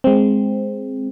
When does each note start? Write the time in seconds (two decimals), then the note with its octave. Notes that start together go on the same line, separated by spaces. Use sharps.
0.04 G#3 C4